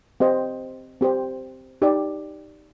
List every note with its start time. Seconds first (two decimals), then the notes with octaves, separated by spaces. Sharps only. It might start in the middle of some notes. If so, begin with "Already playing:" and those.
0.20 C4 G4 C5 D#5
1.01 C4 G4 C5
1.82 D#4 G4 D5